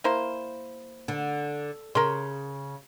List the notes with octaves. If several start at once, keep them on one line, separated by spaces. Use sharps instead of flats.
A#3 E4 C5
D3
C#3 A#4 C6